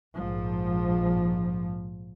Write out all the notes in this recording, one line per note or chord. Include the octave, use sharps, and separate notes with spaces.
A#1 G#2 F3